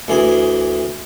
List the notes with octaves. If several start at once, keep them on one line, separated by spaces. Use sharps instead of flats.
D2 E3 G#4